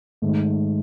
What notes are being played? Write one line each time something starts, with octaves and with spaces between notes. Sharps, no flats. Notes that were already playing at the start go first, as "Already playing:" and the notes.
G#2 D#3 A3